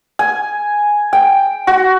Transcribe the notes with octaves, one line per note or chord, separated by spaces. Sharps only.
G#5
G5
F#4